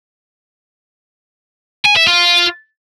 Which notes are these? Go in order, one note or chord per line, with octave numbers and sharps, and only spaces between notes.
G#5
E5
F4